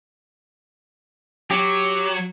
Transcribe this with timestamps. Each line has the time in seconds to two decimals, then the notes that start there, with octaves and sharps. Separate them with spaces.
1.51 F#3 G4